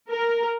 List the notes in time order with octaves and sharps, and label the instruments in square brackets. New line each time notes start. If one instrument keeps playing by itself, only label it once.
[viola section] A#4